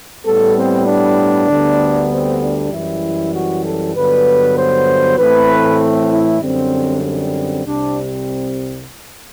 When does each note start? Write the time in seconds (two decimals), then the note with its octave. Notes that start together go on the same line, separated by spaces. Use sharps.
0.23 A2 G3 B3 A4
0.54 C4
0.85 D4
1.48 D2 D3 G3 B3
2.09 C4
2.40 D4
2.71 F#2 E3 G3 E4
3.33 F#4
3.63 A4
3.94 G2 D3 F#3 B3 B4
4.56 C5
5.18 A2 E3 A3 C4 B4
6.10 E4
6.40 F#2 D3 G3 C4
7.03 C4
7.64 C2 C3 G3 C4 D4